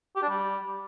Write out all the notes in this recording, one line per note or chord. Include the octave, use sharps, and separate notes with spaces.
G4
D4
G3